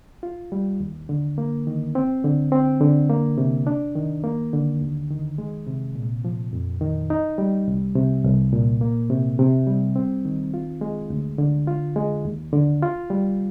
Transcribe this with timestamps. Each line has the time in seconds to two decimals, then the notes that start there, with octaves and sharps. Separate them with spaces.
0.23 F4
0.52 G3
0.80 D#2
1.09 D3
1.38 A#3
1.67 D#3
1.95 C4
2.24 D3
2.52 C4
2.81 D3
3.10 A#3
3.38 C3
3.67 D4
3.95 D#3
4.24 A#3
4.53 D3
4.81 D#2
5.10 D#3
5.38 G#3
5.67 C3
5.95 A#2
6.25 F3
6.53 F2
6.81 D#3
7.10 D#4
7.38 G3
7.68 C2
7.95 C3
8.25 C2
8.53 A#2
8.81 A#3
9.10 C3
9.39 C3
9.67 G3
9.96 C4
10.25 D#3
10.54 F4
10.81 G#3
11.10 D2
11.38 D3
11.67 F4
11.96 G#3
12.25 D#2
12.53 D3
12.83 F4
13.10 G3